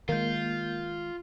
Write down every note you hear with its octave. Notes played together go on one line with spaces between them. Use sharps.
D#3 G#3 A#3 F4 G6